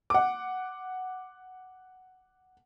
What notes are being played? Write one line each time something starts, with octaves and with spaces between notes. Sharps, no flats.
F#5 D6